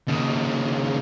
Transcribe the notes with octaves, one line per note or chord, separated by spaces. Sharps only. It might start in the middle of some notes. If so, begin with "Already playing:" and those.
D#2 C#3